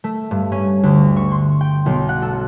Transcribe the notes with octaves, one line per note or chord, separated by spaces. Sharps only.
A3
G2
C#4
D2
C#6
C6
G5
B1
F#5
A4